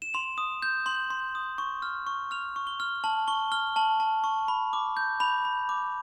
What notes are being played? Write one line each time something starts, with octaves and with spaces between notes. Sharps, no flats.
E7
C6 F7
D#6
G6
C6 F#7
C6
D#6
C#6
F6
C#6
F6 F7
C#6
G7
F6
A5 F#7
C#6 G7
F6 G7
A5 F#7
A5
C#6
B5
D6
G6
B5 F7
B5
D6